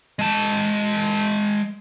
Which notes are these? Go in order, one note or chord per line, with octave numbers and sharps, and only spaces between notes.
G#3 A5